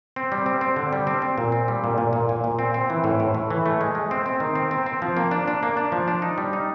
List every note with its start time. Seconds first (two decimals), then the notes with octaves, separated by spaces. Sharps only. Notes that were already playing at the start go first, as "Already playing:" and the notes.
0.16 C4
0.32 G3
0.46 C4
0.61 C4
0.76 D3
0.93 G3
1.07 C4
1.22 C4
1.38 A#2
1.52 C4
1.68 G3
1.84 A#2
1.98 A#2
2.13 A#2
2.29 A#2
2.44 A#2
2.59 C4
2.74 C4
2.90 E3
3.04 A2
3.20 A2
3.35 A2
3.50 E3
3.66 A3
3.81 G#3
3.95 G#3
4.11 C4
4.26 C4
4.40 D#3
4.55 C4
4.71 C4
4.86 C4
5.02 F3
5.17 A#3
5.31 D4
5.48 D4
5.63 A#3
5.77 D4
5.92 F3
6.08 D4
6.22 D#4
6.38 G3
6.53 D#4